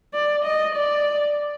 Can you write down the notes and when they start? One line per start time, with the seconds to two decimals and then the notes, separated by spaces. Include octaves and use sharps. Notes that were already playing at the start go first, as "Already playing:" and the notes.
0.13 D5
0.45 D#5
0.76 D5